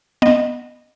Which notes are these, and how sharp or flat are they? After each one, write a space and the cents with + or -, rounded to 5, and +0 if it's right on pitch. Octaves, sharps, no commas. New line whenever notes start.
B3 -10 D#5 -20